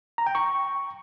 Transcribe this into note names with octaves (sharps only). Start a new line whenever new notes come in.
A#5
G5
C#6